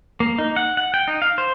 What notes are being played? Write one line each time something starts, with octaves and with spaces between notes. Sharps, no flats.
A#3
D#4
F#5
F#5
G5
D#4
F5
C5